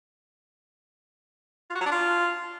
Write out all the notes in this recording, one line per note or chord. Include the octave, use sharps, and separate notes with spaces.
F4
F#4
F#3
D4
F4